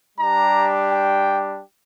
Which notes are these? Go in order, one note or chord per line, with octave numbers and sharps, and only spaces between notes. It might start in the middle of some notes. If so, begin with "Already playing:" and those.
G3 D4 G4 A#5
G5